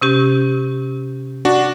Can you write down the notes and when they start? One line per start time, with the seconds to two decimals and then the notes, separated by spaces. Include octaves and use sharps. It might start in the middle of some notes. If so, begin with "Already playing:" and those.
0.01 C3 C#4 G4
1.45 D4 F#4